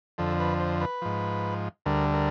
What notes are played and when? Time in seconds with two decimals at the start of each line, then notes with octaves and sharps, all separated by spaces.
0.18 F2 D3 F3 A4
0.40 B4
0.60 C5
0.81 B4
1.02 G#2 F3
1.86 D2 D3 G3 A#4
2.14 A#4